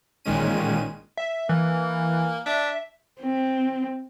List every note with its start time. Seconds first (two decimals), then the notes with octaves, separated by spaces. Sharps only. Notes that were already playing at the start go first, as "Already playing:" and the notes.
0.25 A1 A#2 D#3 G#3 C#4 D#7
1.17 E5
1.49 E3 A#3
2.46 D4 E5
3.21 C4